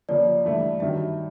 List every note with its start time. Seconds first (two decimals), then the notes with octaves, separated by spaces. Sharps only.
0.09 C#3 F3 A#3 C#4 D5
0.45 G2 E3 A3
0.80 G2 D#3 F#3 E5